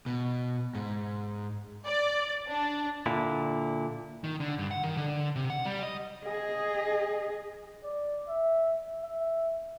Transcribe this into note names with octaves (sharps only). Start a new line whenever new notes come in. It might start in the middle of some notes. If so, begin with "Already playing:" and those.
B2
G#2
D5
D4
A#2 D3 E4
D#3
D3
G2
F#5
D#3
D3
C3
F#5
G3
D#5
G#4 D#5
D5
E5
E5